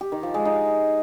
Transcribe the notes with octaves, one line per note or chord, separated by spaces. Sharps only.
G4
D#3
F3
G#3
D#4